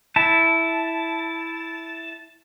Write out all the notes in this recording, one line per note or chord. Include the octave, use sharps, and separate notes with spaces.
E4 A5